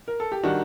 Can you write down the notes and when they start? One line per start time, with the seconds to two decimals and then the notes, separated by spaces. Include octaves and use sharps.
0.08 A#4
0.20 A4
0.32 G4
0.44 D#3 G3 D4 F#4